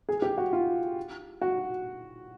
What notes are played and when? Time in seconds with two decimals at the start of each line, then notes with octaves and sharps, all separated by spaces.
0.09 G#4
0.22 G4
0.38 F#4
0.53 F4
1.42 F#4